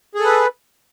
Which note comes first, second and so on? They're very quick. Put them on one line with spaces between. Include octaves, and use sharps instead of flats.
G#4 A4 B4